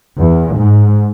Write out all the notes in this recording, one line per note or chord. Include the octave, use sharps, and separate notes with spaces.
E2
G#2